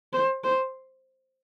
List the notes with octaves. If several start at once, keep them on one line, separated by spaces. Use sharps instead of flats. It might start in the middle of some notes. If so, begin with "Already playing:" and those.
C5
C5